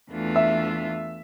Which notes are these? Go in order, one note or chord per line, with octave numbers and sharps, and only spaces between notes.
E2 E3 A3 D4 F4
E5